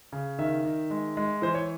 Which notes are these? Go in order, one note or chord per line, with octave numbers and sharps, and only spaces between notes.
C#3
D#3 E5
D#3
G#3
G#3
E3 C5
C#5